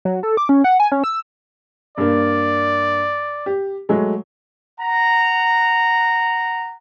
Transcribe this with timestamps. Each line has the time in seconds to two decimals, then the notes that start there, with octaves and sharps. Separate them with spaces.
0.05 F#3
0.23 A4
0.37 D6
0.49 C#4
0.64 F#5
0.80 G#5
0.92 C#4
1.04 E6
1.98 G2 A#3 D5
3.46 G4
3.89 F#3 G#3 A3
4.81 F#5 A#5